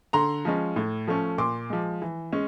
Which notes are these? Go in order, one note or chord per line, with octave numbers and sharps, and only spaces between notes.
D3 A#5 C6
F3 G#3 C#4
A2
F3 A3 C#4
A#2 C6 D6
F3 G#3
E3
G#3 C#4